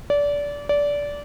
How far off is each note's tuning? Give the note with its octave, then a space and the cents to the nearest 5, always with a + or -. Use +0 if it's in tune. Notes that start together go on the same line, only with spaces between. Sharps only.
D5 -25
D5 -20